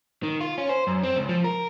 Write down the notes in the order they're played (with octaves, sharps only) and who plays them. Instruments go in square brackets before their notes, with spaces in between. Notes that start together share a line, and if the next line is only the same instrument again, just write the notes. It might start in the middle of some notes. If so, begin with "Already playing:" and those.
[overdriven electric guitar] D#3
F4
C#4
C5
F#2
C4
C#2
F3
A#4